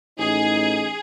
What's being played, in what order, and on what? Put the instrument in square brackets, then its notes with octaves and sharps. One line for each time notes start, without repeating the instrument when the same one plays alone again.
[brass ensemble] A1 D#4 [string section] G#4